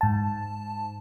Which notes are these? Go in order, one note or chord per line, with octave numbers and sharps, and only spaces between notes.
G#2 A5